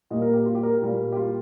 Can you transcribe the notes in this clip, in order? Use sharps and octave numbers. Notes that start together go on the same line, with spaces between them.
A#2 G3 A#3 D#5
A#4
G4
F4
G4
A#4
G4
A#2 G3 A#3
G4
F4